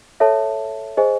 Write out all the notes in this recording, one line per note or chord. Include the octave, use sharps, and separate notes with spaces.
A4 C#5 E5 A5
G#4 C5 D#5 G#5